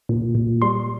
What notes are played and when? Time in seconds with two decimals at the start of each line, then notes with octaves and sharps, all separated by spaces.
0.09 A#2
0.35 A#2
0.62 G3 C6